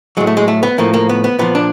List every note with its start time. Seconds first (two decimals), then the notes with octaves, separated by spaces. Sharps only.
0.17 A2 F#3 G#3
0.27 A3
0.37 G#3
0.48 A3
0.63 B3
0.78 A2 F3 A#3
0.94 A#3
1.09 B3
1.24 B3
1.39 A#2 F3 B3
1.55 D4